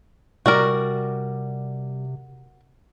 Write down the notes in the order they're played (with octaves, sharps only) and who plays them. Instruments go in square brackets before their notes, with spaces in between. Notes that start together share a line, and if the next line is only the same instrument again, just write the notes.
[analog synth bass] C3 [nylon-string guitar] G3 D5 [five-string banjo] F#4 A#4